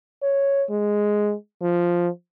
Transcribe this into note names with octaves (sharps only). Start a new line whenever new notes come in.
C#5
G#3
F3